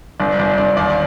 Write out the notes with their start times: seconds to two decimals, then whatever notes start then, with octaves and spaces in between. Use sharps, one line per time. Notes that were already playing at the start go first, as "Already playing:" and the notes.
0.20 G1 D5
0.39 G1 D5
0.58 G1 D5
0.77 D#2 D5